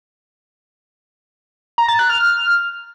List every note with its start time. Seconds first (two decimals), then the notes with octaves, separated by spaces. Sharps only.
1.78 A#5
1.89 A6
1.99 F#6
2.10 F6
2.20 F6